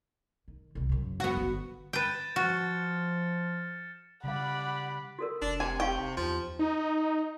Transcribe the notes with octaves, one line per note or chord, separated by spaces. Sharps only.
D#3
C2 C#3
F#2 C#3
B3 F#4
G1 D3
B4 G5 G6 A6 E7
F3 F#4 F6 A6 C#7
C#3 G3 G4 D5 F5 F#5 B5
F#4 A4 A#4
F1 D4
C3 G#5
D#4 G4 F5 G5
E2 F3
D#4